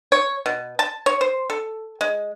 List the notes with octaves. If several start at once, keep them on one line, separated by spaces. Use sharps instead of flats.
C#5
B2
A5
C#5
C5
A4
G#3